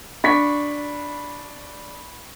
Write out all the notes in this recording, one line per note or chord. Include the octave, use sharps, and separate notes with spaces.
D4 B5 C#6 B6